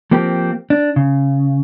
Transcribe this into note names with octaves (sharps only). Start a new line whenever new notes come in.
F3 A#3 C4 G4
D4
C#3